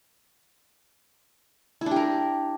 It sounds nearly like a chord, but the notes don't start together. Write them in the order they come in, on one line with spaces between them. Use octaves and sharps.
E4 D4 G4 A#4